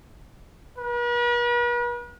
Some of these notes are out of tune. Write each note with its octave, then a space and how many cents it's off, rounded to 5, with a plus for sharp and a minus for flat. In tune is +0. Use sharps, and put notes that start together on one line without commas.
B4 -45